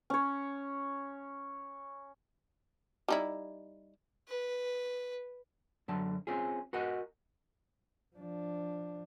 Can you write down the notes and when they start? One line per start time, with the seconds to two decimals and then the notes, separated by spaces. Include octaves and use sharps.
0.10 C#4 C#5
3.08 G3 D#4 E4
4.28 B4
5.88 F#2 D3 F#3 A5
6.27 C4 C#4 F4 G#4
6.73 F#4 A#4 D#5 F#5
8.16 F3 D4